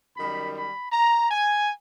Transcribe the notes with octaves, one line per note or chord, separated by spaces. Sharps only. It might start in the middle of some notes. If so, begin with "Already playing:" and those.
F#2 D#3 G3 B5
B5
A#5
G#5